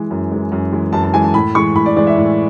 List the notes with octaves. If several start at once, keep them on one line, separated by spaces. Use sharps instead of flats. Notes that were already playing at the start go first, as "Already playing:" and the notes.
Already playing: E3 G#3
F#2
E3 G#3
F#2
E3 G#3
F#2 A5
A5
E3 G#3 G#5
A5
A2 B5
E3 G#3 C#6
A2 B5
D5
E3 G#3 D5
E5
A2